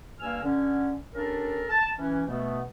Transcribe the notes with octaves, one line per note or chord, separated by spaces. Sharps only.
G2 A#3 G#5 E6 F6
D3 C#4
C#4 D4 G4 A4 A#4
A5
E3 C#4
B2 A3 B3